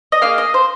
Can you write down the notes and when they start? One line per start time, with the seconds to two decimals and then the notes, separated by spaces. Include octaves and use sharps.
0.12 D#5
0.22 A#3 D#4 G#4 F5
0.38 D#5
0.54 C5